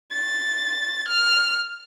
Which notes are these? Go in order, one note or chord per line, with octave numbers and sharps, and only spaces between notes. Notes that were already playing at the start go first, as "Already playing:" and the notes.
A6
F6